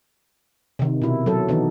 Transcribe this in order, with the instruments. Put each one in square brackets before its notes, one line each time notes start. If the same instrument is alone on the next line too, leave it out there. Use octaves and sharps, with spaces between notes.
[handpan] C3 D#3
B2 E4
F#3 A4
D#3 E3 B3 D#4